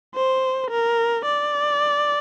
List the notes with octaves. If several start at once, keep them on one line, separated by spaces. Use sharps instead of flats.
C5
A#4
D5